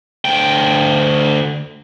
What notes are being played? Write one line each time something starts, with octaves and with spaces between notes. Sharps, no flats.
D2 G5